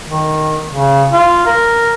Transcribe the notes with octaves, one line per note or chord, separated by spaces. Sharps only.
D#3
C#3
F4
A#4